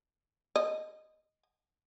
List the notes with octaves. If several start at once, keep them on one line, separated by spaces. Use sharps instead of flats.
D#5